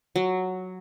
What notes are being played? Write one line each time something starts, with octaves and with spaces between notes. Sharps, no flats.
F#3